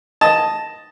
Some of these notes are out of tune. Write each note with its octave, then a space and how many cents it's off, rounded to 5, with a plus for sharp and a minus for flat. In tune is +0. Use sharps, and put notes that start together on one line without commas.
D#5 +0 A5 +0